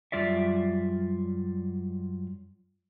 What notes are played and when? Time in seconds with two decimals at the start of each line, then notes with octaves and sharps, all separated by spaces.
0.12 F#2 G3 F4 D5 E5